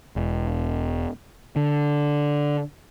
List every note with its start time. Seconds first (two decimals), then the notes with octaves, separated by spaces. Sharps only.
0.16 E1
1.56 D3